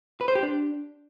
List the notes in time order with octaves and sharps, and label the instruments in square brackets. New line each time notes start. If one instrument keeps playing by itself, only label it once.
[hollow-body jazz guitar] B4
C5
G4
D4